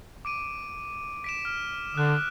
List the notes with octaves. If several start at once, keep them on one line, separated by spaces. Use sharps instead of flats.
D6 D7 D#7
B6 D7 E7
F6
D3 D#6 F#6